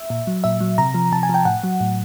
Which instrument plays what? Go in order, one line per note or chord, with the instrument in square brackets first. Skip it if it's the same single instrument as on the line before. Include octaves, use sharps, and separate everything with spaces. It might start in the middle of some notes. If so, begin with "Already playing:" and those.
Already playing: [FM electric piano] E5
A#2
F#3
A#2 E5
F#3
C3 A#5
F3
C3 A5
G#5
F3 G5
A2 F#5
F#3
A2